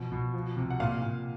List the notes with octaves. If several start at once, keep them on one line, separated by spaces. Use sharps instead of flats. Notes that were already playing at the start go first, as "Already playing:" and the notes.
Already playing: B2 F3
B2
F3
C3
F#5
A#2 F5
A#2